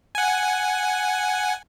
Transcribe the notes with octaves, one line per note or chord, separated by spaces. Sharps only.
F#5 G#5